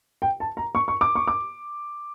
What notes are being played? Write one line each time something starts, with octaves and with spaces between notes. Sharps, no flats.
G5
A5
A#5
C#6
C#6
D6
C#6
D6